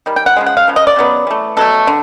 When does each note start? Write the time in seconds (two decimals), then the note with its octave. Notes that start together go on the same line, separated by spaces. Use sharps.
0.06 D#3 G3
0.16 G5
0.26 F#5
0.36 C#3 F3 G#3
0.46 F#5
0.57 F5
0.68 C#3 F3
0.76 D#5
0.87 D5
0.96 C#3 F#3 B3
1.27 E3 A3
1.57 B2 F#3 A3 A4
1.87 D3